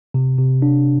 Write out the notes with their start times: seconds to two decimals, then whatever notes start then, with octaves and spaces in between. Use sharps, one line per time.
0.14 C3
0.38 C3
0.62 D4